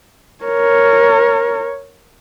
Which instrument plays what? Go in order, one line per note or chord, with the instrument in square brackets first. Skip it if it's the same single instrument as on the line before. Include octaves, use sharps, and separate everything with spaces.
[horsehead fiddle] A#4 C#5